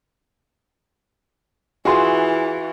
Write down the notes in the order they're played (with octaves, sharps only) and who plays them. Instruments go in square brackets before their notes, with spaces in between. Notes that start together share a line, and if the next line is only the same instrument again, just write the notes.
[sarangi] E3 [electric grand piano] F4 F#4 [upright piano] G#4 C6